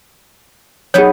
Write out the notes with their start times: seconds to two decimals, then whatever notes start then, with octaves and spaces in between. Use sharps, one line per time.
0.94 F#3 B3 D#4 G#4 C#5